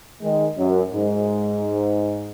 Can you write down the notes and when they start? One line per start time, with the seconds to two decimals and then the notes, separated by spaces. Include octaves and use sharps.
0.22 D#3 G#3
0.57 F#2
0.91 G#2